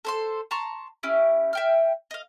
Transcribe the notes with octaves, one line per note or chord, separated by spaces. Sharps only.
A4 C5 C6
A5 A#5 C6 C#6
C#4 E4 G4
E5 G5 F6
D#5 F5